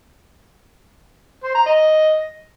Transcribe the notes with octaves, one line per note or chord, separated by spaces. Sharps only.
C5
A#5
D#5